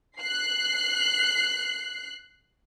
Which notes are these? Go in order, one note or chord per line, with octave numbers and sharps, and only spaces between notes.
F#6 C7